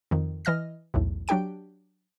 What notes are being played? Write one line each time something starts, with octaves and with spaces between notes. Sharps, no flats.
F2 D#3
E3 D#5 F6 A#6
B1 E2 A2
F#3 D4 G4 G5 D7